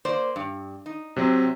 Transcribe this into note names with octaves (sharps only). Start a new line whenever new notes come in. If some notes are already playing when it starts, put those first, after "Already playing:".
A#3 C5 D5
G2
D#4
C3 F#3 C4